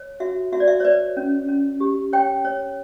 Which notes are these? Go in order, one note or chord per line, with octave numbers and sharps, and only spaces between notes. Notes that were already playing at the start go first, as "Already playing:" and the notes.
Already playing: C#5
F#4 E5
F#4 E5
D5
E5
C#5
B4 D5
C#4
C#4
G4
C#5 G5
C#5